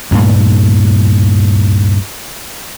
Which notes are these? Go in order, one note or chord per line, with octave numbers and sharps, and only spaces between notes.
D2 G2 A#2 A3